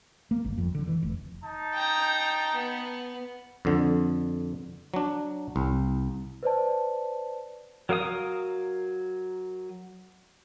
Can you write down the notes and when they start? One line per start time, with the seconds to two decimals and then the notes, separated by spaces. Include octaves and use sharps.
0.31 A#3
0.44 G1
0.58 F2
0.75 D3
0.88 E3
1.03 F1
1.43 D#4 A5
1.74 G5 A#5
2.54 B3
3.65 F2 D3
4.94 F#3 D4
5.56 C2
6.43 B4 C5 D5 A5
7.89 F#3 A#4 F5 D#6